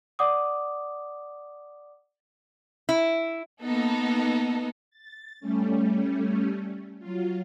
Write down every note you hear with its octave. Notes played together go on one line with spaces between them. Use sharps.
D5 F#5 D6 D#6
E4
A#3 B3 D#4 A4
A6
G3 A3 C#4
F#3 F4